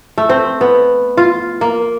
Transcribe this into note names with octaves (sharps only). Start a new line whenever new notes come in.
A3
C4
B3
F4
A#3